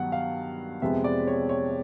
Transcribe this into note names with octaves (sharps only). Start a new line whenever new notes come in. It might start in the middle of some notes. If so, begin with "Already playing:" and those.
Already playing: G2 D#3 F#3 B3 F#5
F5
F2 C3 F3 G#3 B3 E5
D5
C#5
C#5